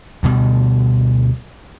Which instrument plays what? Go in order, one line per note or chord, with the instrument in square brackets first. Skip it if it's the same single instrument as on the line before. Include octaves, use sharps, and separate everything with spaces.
[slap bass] D2 B2 G3